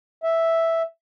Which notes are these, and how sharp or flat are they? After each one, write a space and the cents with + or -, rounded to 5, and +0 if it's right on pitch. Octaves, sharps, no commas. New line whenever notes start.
E5 +0